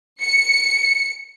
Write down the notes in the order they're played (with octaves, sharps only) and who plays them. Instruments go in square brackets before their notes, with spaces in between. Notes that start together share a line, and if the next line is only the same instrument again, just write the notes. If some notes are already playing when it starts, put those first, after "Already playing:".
[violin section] C#7